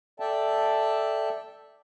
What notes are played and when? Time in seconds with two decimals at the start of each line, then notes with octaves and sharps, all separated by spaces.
0.20 A4 D5 E5 G5 A5